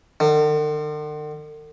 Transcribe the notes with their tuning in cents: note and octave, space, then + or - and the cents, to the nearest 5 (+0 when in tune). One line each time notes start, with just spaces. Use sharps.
D3 +45